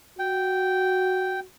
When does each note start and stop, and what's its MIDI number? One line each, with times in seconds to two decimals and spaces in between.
0.19 1.44 66
0.19 1.40 79